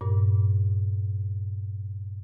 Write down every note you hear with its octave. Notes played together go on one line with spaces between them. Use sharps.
G2 A#2